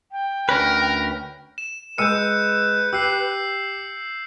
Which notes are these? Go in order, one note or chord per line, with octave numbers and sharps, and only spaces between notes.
G5
D2 C#4 A#4 B4
E7
G#3 B4 E6 G6 C#7 D#7
G4 E6 C7